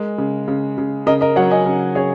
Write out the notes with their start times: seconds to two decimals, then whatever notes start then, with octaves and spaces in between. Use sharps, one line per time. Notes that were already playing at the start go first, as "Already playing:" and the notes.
Already playing: G#3 A#4
0.18 C#3
0.48 C#3
0.78 C#3
1.06 C#3 A#4 D#5
1.21 A#4 D#5
1.36 F#3 C#5 F#5
1.51 D#5 G#5
1.66 C#3 A#4
1.95 C#3 G#4 C#5